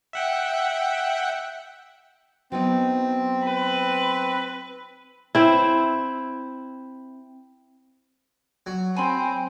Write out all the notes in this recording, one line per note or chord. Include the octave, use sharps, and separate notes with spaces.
E5 F#5 G5
F#3 B3 C4 D#4
B4
C4 E4
F#3
C4 G#5 B5 C6